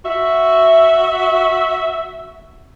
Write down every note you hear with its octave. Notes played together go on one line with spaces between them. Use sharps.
F#4 E5